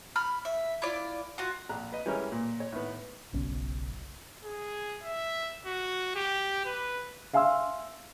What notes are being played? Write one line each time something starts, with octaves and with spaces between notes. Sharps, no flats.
B5 F6
E5
E4 F4 D5
F4 F#4
A#1 A#5 F#6
B4 D#5
E3 G3 G#3 C#4 A#4
A#2
C#5
A2 D#3 B3
F#1 B1 B2 C#4
G#4
E5
F#4
G4
B4
E5 F5 G#5 C6 E6